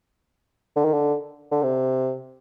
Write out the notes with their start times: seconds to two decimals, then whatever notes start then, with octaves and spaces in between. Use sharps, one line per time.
0.76 D3
0.85 D#3
0.94 D3
1.51 D3
1.63 C3